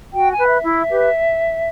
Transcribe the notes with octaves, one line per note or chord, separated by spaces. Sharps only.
F#4 G5
G#5
B4
E5
E4
G4 B4